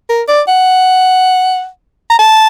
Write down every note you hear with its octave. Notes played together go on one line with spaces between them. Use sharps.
A#4
D5
F#5
A#5
A5